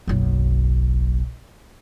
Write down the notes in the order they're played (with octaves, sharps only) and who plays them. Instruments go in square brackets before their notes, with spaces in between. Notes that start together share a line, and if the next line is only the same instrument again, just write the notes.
[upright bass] F#1 B1